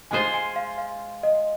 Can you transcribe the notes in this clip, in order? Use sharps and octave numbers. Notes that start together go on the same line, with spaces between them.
G#3 F4 G#4 C5 G#5
G#5
F5
F5
D#5